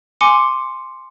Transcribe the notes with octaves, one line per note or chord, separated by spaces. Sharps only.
G#5 C6 D6 C#7